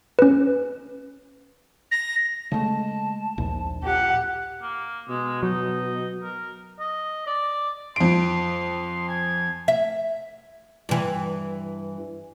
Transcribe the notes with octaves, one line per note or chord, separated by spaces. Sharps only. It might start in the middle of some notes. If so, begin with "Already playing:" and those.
C#4 B4
A#6
C#3 G#3 A3 A5
A#1 D#2
A#2 G4 F#5
A#3
B2 G#3
F#3 D#4
A#4
D#5
D5
F2 C6 D7
G#5
E5
G2 E3